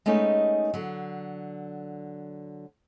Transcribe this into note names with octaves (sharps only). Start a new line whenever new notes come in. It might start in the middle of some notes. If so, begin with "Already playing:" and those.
G#3 A3 B3 C#4 D#4 A#4
D3 F#3